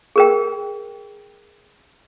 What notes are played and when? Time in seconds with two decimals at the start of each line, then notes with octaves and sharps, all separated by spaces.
0.16 G#4 A#4 G5